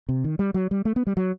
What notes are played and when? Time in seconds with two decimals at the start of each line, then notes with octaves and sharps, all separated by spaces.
0.09 C3
0.24 D#3
0.39 G3
0.54 F#3
0.71 G3
0.85 A3
0.96 B3
1.07 G3
1.17 F#3